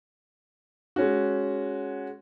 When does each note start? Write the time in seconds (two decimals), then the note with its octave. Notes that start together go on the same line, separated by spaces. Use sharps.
0.96 G#3 C#4 F#4